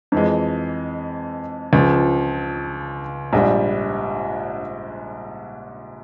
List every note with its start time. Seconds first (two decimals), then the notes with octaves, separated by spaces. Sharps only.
0.12 F2 E3 G#3
1.73 C#2 C#3 F3
3.33 A#1 G#2 G3